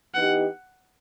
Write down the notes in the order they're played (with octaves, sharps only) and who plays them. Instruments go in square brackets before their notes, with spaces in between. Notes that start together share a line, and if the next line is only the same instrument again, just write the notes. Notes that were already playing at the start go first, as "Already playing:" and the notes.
[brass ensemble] E3 B3 D#4 G4 [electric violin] F#5